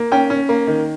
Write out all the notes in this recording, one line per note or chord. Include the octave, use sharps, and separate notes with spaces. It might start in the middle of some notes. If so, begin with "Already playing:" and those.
Already playing: A#3
C#4 G5
C#4
A#3
D#3